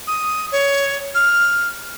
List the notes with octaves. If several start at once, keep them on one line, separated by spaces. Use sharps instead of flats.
D#6
C#5
F6